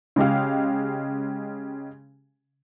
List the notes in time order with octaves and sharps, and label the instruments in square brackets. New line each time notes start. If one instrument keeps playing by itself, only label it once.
[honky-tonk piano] C#3 G#3 G4 F5